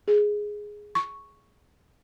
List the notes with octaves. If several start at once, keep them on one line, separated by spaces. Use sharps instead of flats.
G#4
C#6